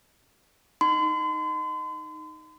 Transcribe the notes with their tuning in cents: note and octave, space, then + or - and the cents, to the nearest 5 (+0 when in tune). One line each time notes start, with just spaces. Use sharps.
D#4 +0 C6 -40